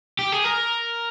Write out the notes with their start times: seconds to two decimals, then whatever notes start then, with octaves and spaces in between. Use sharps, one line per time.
0.19 G4
0.32 G#4
0.45 A#4